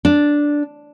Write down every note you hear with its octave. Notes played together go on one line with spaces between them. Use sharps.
D4